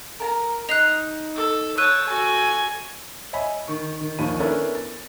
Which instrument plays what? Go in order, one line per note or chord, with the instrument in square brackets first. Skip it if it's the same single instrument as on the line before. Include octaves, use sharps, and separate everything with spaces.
[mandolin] A#4 A5 A#5
[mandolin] D#4 [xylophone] F#6 C7 F7
[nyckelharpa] A4
[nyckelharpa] C#5 A5 [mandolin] G5 [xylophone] E6 F#6 D#7
[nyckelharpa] F#4 A4 [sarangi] G#5
[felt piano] C#5 D#5 E5 G#5 B5
D#3 C#6
D#3
A#1 D#2 D#3 B5 D#7
B3 C#4 D4 E4 A4 A#4
A6